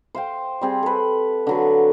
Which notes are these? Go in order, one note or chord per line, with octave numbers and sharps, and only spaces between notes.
C5 F5 G5
G3 C4 G#4
A4 B4
D3 F#3 B4